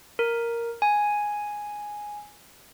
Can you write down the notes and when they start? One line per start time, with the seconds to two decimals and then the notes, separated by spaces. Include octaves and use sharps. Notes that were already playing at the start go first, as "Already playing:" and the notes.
0.19 A#4
0.82 G#5